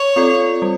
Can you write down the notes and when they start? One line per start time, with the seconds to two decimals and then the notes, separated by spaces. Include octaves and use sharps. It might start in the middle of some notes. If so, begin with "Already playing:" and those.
Already playing: C#5
0.16 C4 F4 A4 D5
0.62 G3